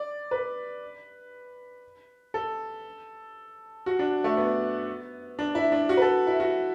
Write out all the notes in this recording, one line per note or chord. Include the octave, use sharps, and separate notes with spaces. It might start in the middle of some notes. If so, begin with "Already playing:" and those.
Already playing: D5
B4
A4
F#4
D4
A3
B3
D4
E4
D4
F#4
B4
A4
E4
F#4